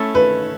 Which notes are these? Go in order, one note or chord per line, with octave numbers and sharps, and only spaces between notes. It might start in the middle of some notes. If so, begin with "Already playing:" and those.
Already playing: A3 C#4 E4 A4
B4